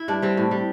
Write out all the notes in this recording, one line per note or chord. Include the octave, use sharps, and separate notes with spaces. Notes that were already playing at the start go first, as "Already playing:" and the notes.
Already playing: E4
G2 D4
G3 C4
A2
G3